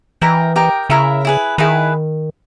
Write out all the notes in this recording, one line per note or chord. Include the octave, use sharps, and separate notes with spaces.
E3 A#4 D#5 G5
G4 A#4 D#5 G5
C#3 E4 A#4 E5
E4 G#4 B4
D#3 E4 G#4 B4